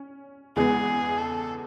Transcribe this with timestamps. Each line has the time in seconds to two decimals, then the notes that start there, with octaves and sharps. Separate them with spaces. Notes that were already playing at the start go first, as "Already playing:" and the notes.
Already playing: C#4
0.56 E2 C#3 G#3 B3 G#4
1.17 A4